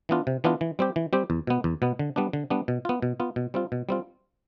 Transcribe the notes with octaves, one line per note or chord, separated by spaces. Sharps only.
E3 B3 D4 F4
C3
E3 B3 D4 F4
E3
G3 C4 G4
E3
G3 C4 G4
E2
B2 B3
E2
B2 B3
D3
G3 B3 D4
D3
G3 B3 D4
B2
B3 F4
B2
B3 F4
B2
G3 C4 F4
B2
G3 C4 F4